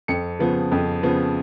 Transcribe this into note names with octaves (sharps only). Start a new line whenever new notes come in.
F2 C#7
C#3 F3 B3
F2
C#3 F3 B3